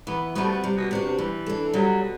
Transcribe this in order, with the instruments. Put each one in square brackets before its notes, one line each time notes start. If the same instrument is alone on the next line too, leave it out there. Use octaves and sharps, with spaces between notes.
[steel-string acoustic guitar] E3 [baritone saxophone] B3
[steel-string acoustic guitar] G3 C4 F#4 [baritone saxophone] B3
[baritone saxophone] A3
B3
[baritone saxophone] C3 [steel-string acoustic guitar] G3
[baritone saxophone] B2
[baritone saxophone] C3 [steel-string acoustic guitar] B3 D4 F#4
[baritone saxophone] C3
[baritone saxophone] E3 [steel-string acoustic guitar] G3
[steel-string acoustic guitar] D4 A4
[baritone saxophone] F#3 [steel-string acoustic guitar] G3
[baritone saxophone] B2